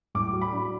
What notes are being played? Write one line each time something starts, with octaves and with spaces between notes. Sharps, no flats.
A2 D6
F#3
B5
D4